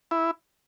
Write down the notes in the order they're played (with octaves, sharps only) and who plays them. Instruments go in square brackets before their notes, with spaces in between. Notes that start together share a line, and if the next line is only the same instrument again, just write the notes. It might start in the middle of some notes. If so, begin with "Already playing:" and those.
[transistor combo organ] E4